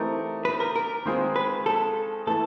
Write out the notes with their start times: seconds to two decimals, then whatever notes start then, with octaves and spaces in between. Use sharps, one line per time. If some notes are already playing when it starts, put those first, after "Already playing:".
Already playing: E3 A3 C4 D#4 G4 A#4
0.45 B4
0.60 A#4
0.76 A#4
1.05 D#3 G#3 C4 F4 G#4
1.36 B4
1.66 A4
2.27 E3 A3 A4